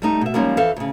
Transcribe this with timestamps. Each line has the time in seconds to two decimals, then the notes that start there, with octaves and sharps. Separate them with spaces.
0.02 G3 A3 D#4
0.21 B2 E5
0.34 F3 G3 G#3 A#3 C#4 D#4
0.57 F2 E3 A4 C5 E5 F5
0.76 D2 C#3